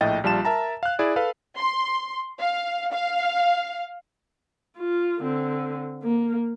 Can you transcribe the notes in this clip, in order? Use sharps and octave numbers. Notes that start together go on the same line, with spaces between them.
A#1 A2 D#5 G5 A6
A#1 G3 F4 A5 E7
A#4 E5 A5 A#5
F5 F#6
E4 G#4 D5
A4 B4 F5
C6
F5
F5
F4
D3 C4
A#3